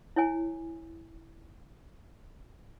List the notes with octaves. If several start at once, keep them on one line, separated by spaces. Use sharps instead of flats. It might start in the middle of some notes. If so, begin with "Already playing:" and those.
E4 C#5 G#5